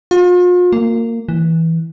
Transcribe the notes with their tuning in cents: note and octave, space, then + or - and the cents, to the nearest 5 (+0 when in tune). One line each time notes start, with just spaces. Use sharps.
F4 +40
A#3 -20
E3 -15